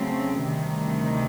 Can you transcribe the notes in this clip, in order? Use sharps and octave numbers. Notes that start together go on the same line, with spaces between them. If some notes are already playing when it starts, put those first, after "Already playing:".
Already playing: C#3 F#3 A3 C4
D2 C3 D#3 G3